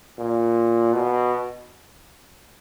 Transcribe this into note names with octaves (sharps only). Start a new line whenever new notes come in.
A#2
B2